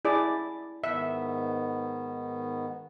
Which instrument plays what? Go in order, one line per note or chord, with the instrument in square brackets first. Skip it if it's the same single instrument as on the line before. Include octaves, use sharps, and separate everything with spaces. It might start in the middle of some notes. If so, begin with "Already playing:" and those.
[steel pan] E4 G#4 D5
[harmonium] G#2 D#3 B3 [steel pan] E5